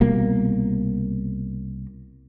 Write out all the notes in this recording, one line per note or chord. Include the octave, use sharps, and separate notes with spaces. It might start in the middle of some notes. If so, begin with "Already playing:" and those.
C2 B2 G3 A#3